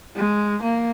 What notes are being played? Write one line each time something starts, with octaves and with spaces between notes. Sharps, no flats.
G#3
A#3